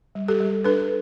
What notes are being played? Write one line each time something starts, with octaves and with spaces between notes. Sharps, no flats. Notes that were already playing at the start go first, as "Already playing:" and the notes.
G3
G4 A4
G3
D4 A4 B4